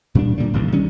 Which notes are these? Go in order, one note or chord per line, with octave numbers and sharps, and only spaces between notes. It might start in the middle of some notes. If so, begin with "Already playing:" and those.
A#2 G3 B3 D4
A#2 D3 G3
G1 C2 C3 D#3
D#3 G3 C#4 D4